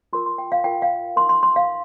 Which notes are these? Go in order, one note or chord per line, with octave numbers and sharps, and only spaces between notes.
F4 A#4 C6
C6
G5
F5
F4 A#4 G5
F5
A#4 C6
D#4
C6
C6
F5